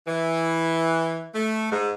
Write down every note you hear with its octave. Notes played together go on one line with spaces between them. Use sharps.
E3
A3
G#2